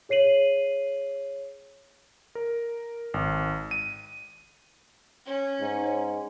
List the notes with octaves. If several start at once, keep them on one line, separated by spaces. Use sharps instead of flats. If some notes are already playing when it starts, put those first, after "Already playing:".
G#4 C#5 C7 D#7 F#7
A#4
G#1
D#7
C#4
G#2